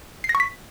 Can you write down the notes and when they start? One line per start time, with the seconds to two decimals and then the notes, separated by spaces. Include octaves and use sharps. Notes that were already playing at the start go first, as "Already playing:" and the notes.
0.24 C7
0.29 A#6
0.35 C#6
0.40 B6